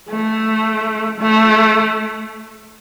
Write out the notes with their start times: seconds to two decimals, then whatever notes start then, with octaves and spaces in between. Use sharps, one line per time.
0.10 A3
1.20 A3